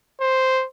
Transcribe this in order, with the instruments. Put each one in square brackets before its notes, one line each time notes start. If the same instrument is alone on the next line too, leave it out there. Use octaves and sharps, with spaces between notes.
[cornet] C5